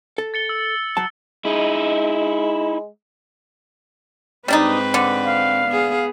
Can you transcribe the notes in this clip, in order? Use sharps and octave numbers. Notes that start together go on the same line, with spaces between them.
A4
A6 C#7 G7
E6
F#3 A5
G#3 D#4 E4
G#2 G3 C4 D4 D#4 B4
D3 D6
F5
B3 G#4